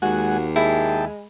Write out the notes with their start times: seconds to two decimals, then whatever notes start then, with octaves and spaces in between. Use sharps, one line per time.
0.02 D#2 G#3 F#4 F#5 G#5
0.56 G#3 E4 G#4 G5 A5